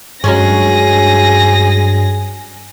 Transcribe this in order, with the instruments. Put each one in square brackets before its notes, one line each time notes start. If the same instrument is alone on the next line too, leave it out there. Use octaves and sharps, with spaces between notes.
[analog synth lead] G2 [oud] F#3 G#3 C#4 [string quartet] G#4 A#6